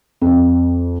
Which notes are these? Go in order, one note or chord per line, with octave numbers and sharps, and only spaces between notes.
F2